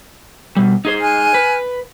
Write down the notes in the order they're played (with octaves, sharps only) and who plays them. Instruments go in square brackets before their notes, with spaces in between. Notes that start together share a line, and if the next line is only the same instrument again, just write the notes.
[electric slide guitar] B2 G3
[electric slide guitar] D#4 G#4 C5 [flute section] G#6
[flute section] G#5 F6 F#6
[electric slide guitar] B4